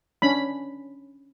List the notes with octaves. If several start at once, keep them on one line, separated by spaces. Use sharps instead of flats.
C#4 D4 B5